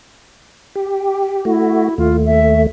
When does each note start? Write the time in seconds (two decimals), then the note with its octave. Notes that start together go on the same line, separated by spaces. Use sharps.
0.75 G4
1.45 A3 E4 F#4
1.98 D#2 A3 F4
2.26 E5